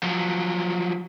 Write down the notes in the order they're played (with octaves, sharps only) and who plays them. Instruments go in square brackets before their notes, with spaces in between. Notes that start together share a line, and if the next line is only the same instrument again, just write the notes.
[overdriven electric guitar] F3 F#3